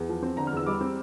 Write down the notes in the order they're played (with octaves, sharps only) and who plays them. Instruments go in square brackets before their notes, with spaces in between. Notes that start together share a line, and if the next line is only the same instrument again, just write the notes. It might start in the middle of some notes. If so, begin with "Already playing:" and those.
Already playing: [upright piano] E2
F3
C4
D3 A#5
F6
E2 E6
G3 D6
C4